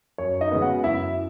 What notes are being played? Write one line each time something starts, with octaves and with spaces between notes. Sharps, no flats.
F#2 C#5
D#4 D#5
C#3 G#3 B3
F#4 F#5
F#2 E4 E5